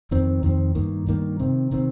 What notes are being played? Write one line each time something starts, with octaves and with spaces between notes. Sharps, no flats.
F2 D#3 C4
F2 D#3 C4
G2 D#3 A#3
G2 D#3 A#3
C3 D#3 C4
C3 D#3 C4